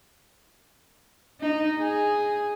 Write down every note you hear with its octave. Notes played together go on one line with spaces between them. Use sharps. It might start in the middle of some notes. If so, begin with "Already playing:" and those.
D#4
G#4